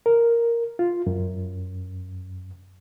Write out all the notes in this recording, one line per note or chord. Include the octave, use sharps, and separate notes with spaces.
A#4
F4
F#2